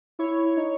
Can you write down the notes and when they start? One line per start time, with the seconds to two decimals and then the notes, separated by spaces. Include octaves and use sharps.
0.19 E4 C#5
0.57 D#4